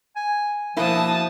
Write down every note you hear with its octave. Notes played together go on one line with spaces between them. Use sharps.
G#5
B2 F3 A#3 E4 A5 D#6